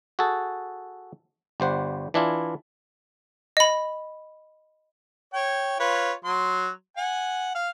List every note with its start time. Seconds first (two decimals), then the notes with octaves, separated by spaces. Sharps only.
0.19 F#4 G#4 A4
1.60 G1 G3 C5 F#5
2.14 E3 D4 E4 F4
3.57 D#5 B5
5.34 C#5 G5
5.80 F4 B4 C#5
6.24 F#3 C6
6.97 F#5 G#5
7.55 F5